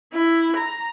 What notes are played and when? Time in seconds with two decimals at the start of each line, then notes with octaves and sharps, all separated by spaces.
0.13 E4
0.57 A#5